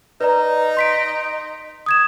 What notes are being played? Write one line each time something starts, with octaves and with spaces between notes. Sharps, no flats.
D#4 B4 D5 A#5
C6 B6 D7
D#6 G#6 E7